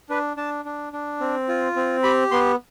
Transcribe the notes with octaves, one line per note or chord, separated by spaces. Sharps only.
D4 B4
D4 A5
D4
D4
C4
F4
C4
G4 B5
B3 C6